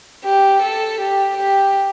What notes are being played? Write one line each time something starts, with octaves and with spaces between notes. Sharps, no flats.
G4
A4
G4
G4